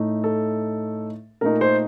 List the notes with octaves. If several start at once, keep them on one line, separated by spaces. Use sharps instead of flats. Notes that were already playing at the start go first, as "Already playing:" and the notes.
Already playing: A2 A3 D#4
A4
A#2 A3 D#4 A#4
C5